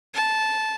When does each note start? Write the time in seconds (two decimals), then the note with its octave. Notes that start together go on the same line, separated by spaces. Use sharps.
0.14 A5